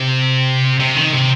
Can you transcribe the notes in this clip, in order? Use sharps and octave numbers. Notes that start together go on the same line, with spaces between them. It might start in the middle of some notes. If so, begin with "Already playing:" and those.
Already playing: C3
C3
D#3
C3